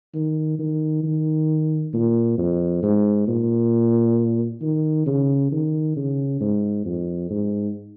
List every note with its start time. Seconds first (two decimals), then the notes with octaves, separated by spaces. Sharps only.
0.14 D#3
0.59 D#3
1.04 D#3
1.94 A#2
2.38 F2
2.83 G#2
3.27 A#2
4.61 D#3
5.07 C#3
5.51 D#3
5.96 C#3
6.40 G#2
6.85 F2
7.30 G#2